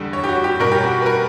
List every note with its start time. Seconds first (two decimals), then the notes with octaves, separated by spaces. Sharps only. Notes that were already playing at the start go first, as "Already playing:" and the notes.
Already playing: E2 D3 G3
0.13 C#5
0.24 G4
0.29 F#4
0.44 G4
0.60 B2 G3 C#4 A#4
0.72 G4
0.84 F#4
1.02 B4
1.06 A#4